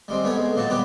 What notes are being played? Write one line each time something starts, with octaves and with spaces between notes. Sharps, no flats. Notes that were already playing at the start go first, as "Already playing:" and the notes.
G3 G#3 C4
A3 B3 C#5 G#5
G#3
A#2 F#3 F#4 A5
G3 B3 G4 B4